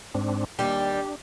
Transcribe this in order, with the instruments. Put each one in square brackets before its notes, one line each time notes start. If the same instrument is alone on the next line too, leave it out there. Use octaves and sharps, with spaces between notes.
[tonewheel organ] G#2 C4 D4
[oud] D#2 G3 [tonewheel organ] D4 [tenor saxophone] G4